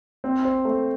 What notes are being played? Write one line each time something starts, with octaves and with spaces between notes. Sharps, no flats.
C4
C5
A3